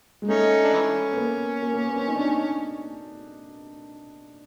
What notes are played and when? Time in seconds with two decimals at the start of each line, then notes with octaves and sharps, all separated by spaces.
0.22 G#3
0.28 A3 C#4 D#4
0.64 D4
0.73 E3 C#4
1.13 B3
1.17 A#3
1.62 A#3
1.74 A#3
1.85 B3
1.96 C4
2.08 D#4
2.16 D4
2.25 D#4